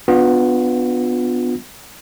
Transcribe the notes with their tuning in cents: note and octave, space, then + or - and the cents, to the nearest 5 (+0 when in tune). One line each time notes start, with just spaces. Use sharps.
B3 +10 D4 +0 F4 +30